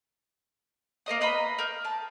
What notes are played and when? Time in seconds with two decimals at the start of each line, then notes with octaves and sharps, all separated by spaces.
1.06 A#3 A#4 D#5 D#6
1.21 B4 D#5 A#5 B5
1.59 A#4 G6
1.85 A5